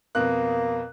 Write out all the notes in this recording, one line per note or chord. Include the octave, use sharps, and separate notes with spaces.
F2 B2 A#3 F#6